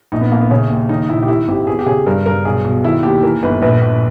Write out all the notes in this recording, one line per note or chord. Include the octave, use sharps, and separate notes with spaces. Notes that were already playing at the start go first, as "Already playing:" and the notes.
A#1 D#4
B3
A#1 A#3
B3
C#3 C#4
D#2
D#3 D#4
A#1 E4
G4
D#3 E4
G#1 G4
E2 G#4
G4
C#3 G#4
G2 A#4
G2 A#4
B1 G#4
B2
D#3 E4
D#2 G4
E3 A#4
G1 B4
A#1 B4
A#1